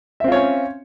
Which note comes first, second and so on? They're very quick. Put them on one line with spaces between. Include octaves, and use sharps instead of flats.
E5 C4 F4 C#5 C#4